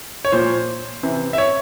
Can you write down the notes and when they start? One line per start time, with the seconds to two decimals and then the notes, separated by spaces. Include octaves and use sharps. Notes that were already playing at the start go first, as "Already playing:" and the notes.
0.25 C#5
0.32 A#2 F3 C5
1.03 C3 E3
1.33 E5
1.38 C#5